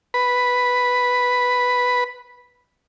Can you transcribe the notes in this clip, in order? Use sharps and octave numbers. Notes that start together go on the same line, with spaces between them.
B4 B5